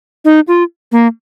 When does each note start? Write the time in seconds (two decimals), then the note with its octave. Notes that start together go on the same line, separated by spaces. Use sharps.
0.25 D#4
0.48 F4
0.92 A#3